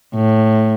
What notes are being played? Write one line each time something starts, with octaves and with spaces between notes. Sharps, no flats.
A2